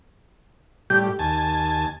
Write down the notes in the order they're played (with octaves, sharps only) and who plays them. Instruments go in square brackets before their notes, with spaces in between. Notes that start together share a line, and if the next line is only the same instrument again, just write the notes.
[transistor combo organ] A2 G3 G4 [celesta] G6
[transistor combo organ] D#2 G#5 A5